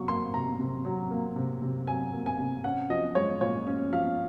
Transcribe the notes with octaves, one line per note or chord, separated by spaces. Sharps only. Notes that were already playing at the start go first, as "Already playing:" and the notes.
Already playing: C3 F#3 C#6
A#3 C6
C3 A#5
C3
F#3
A#3
C3
C3
F#3 G#5
A#3
G#5
C3
C#4 F#5
F3 D#5
G#3 C#5
A#2 C#5
C#4
F3 F5